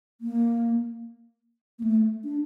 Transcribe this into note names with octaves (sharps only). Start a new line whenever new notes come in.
A#3
A#3
A3
D4